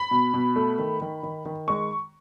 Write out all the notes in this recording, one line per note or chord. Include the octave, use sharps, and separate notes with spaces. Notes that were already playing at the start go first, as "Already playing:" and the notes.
Already playing: B5
B2
B2
A3
D#3
D#3
D#3
D#3
G#3 C#6